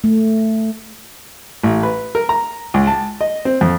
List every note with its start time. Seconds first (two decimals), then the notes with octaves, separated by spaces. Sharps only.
0.04 A3
1.63 A1
1.83 B4
2.15 A#4
2.29 A#5
2.74 C#2
2.87 A5
3.21 D#5
3.45 C4
3.61 F2